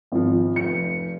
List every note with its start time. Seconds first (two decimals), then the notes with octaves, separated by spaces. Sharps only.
0.12 G#1 F3
0.56 F1 C#7